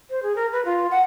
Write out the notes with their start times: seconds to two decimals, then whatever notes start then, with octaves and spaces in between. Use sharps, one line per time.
0.10 C5
0.23 G#4
0.36 A#4
0.53 B4
0.65 F4
0.91 F#5